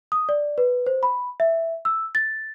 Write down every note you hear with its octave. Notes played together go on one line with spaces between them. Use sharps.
D#6
D5
B4
C5
B5
E5
E6
A6